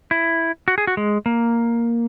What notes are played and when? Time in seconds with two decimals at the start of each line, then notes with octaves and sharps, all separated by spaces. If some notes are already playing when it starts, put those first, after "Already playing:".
0.11 E4
0.68 F#4
0.78 G#4
0.87 F#4
0.97 G#3
1.26 A#3